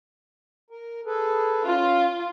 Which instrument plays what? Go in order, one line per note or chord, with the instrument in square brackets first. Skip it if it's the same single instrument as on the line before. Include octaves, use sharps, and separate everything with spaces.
[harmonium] A#4
G#4 A4 B4
[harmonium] C#4 [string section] F4